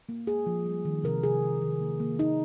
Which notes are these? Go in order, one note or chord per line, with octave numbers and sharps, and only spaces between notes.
A#3
A#3 G#4
F3
G3
D#3
C3 A#4
C3 G#4
D#3
D#3
A#3
A#3
A#3 D#4